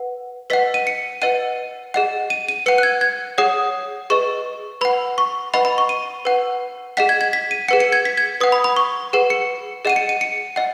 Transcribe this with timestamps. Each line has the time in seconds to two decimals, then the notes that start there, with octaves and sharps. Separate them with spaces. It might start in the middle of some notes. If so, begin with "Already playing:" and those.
Already playing: B4 F#5
0.50 B4 D#5 F#5 B6
0.74 D#7
0.87 C#7
1.22 B4 D#5 F#5 D#7
1.94 G#4 D#5 F#5
2.30 D#7
2.49 D#7
2.66 B4 F#5 C#7
2.78 F#6
2.83 G#6
3.01 G#6
3.38 G#4 C#5 F#5 D#6
4.10 G#4 B4 D#5 C#6
4.81 B4 F#5 B5
5.18 C#6
5.54 B4 D#5 F#5 B5
5.65 B5
5.78 C#6
5.89 D#7
6.25 B4 F#5
6.97 G#4 D#5 F#5 B6
7.09 G#6
7.21 G#6
7.33 B6
7.51 D#7
7.68 G#4 B4 F#5 C#7
7.80 C#7
7.93 G#6
8.05 B6
8.17 G#6
8.40 B4 F#5 D#6
8.52 B5
8.64 B5
8.76 C#6
9.13 G#4 B4 F#5
9.30 C#7
9.85 G#4 D#5 F#5 D#7
9.96 C#7
10.09 D#7
10.21 C#7
10.56 D#5 F#5